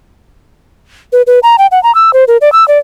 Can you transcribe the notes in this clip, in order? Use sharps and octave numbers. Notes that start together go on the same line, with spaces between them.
B4
B4
A#5
G5
F#5
A#5
E6
C5
A#4
D5
E6
D5